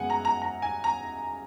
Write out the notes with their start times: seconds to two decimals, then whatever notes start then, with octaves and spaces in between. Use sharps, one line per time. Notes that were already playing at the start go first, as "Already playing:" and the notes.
Already playing: F#2 C#3 G#3 B3 F#5 G#5
0.10 A#5
0.25 A#5
0.42 A#5
0.62 G#5
0.84 A#5